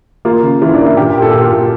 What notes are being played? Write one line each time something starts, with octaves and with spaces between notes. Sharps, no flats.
A#3 F4
C#3
E3 F4
D4
A#3
E4
A#2 G4
G4
A#2
A4
A#2 G4
F4
A#2 G4